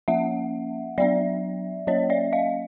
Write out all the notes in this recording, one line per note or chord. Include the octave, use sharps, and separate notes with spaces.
F3 A#3 C#4 E5 F#5
F#3 B3 D4 D5 E5
F#3 A#3 C#4 C#5 D#5
D5 E5
D#5 F5